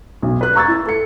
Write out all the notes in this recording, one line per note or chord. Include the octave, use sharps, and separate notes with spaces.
B1
B4 F#6
A#5 C#6 E6 G#6 A6
E4
A4 C#7